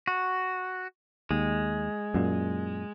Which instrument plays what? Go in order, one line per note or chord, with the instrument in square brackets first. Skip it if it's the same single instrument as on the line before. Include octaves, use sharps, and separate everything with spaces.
[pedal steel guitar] F#4
[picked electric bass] D#2 [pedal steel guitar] G#3
[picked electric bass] F#2 A#2